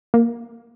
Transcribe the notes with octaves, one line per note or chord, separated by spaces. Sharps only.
A#3